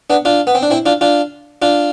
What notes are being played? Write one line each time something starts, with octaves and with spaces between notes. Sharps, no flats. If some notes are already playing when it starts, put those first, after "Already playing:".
B3 D4
D4 F4
B3
C4
D4
C4 E4
D4 F4
D4 F4
D4 F4